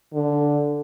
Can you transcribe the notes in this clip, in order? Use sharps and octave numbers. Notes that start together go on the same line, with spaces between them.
D3